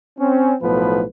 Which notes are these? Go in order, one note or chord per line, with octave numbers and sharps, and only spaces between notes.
C4 C#4
B1 A2 F3 B3 B4